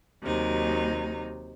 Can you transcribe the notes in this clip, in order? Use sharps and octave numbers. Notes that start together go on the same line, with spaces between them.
D#2 C3 F#3 D#4